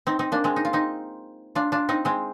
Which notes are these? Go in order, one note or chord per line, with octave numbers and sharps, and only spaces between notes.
C4 D#4
C4 D#4
A#3 D4
G#3 C4
D#4
F4
C4 D#4
D4 F4
D4 F4
C4 D#4
G#3 C4